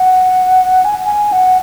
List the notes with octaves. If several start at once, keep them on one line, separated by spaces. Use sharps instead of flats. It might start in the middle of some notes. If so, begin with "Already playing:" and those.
Already playing: F#5
G#5
G#5
F#5